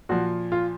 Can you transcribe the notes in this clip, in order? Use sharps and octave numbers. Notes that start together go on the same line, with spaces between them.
A#2 F3 F#4
F4